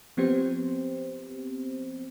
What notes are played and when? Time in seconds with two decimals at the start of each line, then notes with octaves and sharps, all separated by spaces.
0.17 F3 B3 C4 G4 C5